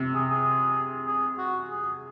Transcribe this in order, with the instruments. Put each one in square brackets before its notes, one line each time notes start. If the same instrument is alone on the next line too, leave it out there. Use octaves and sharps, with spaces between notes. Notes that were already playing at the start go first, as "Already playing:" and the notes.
Already playing: [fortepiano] C3
[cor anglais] G#4
G#4
G#4
F#4
G#4